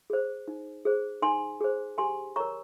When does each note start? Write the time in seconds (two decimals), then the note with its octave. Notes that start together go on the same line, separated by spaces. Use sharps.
0.10 G#4 C5
0.48 D#4
0.85 G#4 C5
1.22 D#4 G#5 C6
1.61 G#4 C5
1.98 G4 G#5 C6
2.36 A#4 C#5 A#5 C#6